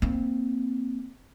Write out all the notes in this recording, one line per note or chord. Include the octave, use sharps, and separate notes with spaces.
A#3 C4